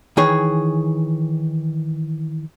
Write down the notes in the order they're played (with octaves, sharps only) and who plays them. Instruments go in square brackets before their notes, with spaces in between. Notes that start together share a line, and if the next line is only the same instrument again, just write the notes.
[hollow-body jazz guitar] D#3 E3 G#4 C#5